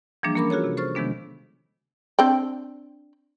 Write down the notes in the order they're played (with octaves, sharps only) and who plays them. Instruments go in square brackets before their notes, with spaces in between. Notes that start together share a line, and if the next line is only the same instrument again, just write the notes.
[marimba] E3 F3 G3 A#3 D4 G#4
A#3 C#4 A#4 B5 D6
F4 F#4 G#4 A4 C#5
C3
A4 C5 C#6 F6 A6
C3 D#3 F3 G#3 B3 D4
[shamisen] C4 D4 G5